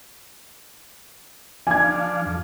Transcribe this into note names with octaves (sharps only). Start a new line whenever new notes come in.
F3 D4 G#5 G#6
F2